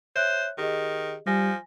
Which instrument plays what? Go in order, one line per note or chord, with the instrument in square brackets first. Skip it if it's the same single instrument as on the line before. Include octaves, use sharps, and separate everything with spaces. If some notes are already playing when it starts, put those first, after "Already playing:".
[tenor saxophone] C5 [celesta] C#5 E5 F#6
[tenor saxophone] D#3 [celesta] G4 G#4 D#5
[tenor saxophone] F3 [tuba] G3 [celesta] G#5 A#6